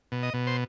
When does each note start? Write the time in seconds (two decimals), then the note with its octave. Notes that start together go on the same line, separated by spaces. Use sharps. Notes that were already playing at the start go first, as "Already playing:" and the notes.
0.12 B2
0.23 D#5
0.34 B2
0.47 C5